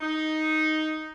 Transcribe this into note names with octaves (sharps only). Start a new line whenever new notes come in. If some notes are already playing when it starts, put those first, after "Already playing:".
D#4